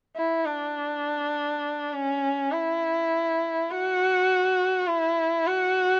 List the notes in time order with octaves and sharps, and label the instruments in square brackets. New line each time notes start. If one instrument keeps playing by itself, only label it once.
[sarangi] E4
D4
C#4
E4
F#4
E4
F#4